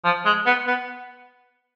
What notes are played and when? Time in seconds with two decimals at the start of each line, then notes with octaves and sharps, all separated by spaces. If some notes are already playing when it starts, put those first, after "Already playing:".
0.04 F3
0.25 G#3
0.46 B3
0.67 B3